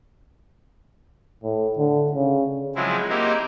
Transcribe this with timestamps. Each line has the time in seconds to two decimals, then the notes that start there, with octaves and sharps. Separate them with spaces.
1.43 A2
1.78 D3
2.12 C#3
2.75 F3 F#3 G#3 C4 E4
3.09 A#3 C4 D#4 E4 G4